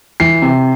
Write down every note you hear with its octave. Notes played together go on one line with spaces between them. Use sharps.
E3 C7
C3